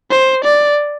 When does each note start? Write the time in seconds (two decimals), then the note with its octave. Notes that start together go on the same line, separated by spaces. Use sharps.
0.11 C5
0.45 D5